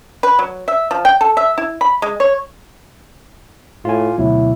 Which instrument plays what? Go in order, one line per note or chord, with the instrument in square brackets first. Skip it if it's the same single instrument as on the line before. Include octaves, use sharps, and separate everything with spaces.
[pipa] B4
F#3
E5
F3
G5
A4
E5
E4
B5
G#3
C#5
[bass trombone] A2 [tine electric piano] F4 G#5
[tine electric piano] D2 B2 F#3 [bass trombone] E4